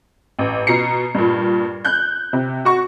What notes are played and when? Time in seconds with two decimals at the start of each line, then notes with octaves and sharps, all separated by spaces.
0.39 A1
0.67 B2 A#5 C7 C#7
1.15 G2 A#2
1.85 F#6 G6
2.33 C3
2.65 F#4 C#6